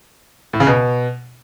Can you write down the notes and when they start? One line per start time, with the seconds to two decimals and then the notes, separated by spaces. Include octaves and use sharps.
0.53 A2
0.60 C#3
0.67 B2